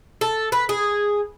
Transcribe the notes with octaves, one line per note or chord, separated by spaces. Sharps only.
A4
B4
G#4